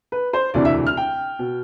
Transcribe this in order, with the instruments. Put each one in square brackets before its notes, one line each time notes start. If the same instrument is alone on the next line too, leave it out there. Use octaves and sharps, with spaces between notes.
[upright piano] B4
C5
E1 D2 C3 E3 D5
E5
F6
G5
B2